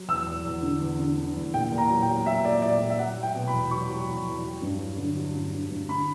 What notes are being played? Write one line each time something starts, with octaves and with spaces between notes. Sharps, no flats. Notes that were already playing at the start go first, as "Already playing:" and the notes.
Already playing: F#3
E2 E6
E2
E2
D3
E2
D3
D3
E2
A#2 G5
A#2
A#5
F#3
G5
F#3
F#3 E5
A#2 D5
F#3 D5
A#2
E5
F#3 F#5
F#3
G5
B2
B5
E2
F#3 C#6
F#3
E2
E2
F#3
G2
F#3
D3
F#3
G2
D3
G2
D3 B5